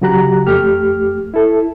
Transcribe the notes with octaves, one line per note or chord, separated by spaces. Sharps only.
C#3 F#3 F#4 G4 A#5 F#6
F2 A3 G4 F6
E4 A4